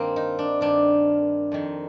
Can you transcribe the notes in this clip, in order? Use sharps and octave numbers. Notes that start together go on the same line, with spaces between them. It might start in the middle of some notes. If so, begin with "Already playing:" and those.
Already playing: G2 D#3 A#3 C4
D#4
D4
G2 D#3 D4
F2 D#3